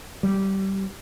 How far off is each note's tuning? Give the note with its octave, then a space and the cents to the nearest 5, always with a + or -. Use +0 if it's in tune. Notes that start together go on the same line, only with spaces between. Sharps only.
G3 -15